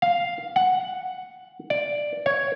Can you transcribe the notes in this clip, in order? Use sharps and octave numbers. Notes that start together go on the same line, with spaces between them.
F5
F#5
D5
C#5